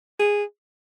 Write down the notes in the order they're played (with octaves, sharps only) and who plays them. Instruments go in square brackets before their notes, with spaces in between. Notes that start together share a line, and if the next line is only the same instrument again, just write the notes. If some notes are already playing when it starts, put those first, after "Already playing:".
[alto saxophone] G#4